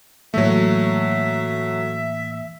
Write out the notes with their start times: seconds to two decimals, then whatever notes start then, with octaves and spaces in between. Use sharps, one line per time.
0.34 A2 E3 F#3 A3 A#3 E5